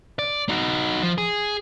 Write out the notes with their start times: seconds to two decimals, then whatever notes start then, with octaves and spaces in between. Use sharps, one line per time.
0.19 D5
0.49 D#4 F#4
1.03 F3
1.18 G#4